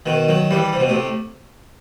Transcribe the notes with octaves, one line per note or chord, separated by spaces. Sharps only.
B2 D#3
D#3 F#3
E3 G3
C3
B2
A2 C3